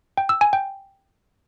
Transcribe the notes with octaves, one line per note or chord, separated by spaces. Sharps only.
G5
E6
G#5
G5